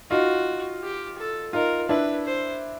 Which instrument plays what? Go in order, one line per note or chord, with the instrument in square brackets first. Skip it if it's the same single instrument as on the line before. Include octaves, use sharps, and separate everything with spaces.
[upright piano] D#4 F4 [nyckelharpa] F#4
[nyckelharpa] G4
A4
[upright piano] D#4 F4 [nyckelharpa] A#4
[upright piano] D4 E4 [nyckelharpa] B4
[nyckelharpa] C5